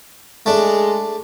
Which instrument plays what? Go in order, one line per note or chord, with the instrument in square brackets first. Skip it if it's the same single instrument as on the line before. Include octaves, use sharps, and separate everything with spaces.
[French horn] G#3 [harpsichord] A3 D4